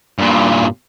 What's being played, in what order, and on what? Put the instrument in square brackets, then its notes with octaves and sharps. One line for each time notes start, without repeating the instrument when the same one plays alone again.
[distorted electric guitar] G2 A#2